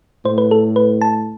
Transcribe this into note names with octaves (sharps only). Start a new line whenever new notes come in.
A2 C5
B4
A4
B4
A5